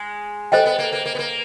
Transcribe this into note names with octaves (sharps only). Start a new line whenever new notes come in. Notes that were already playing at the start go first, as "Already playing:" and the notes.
Already playing: G#3
G3 A4 C5 D#5 G5
B3
A#3
A#3
A#3
B3
A#3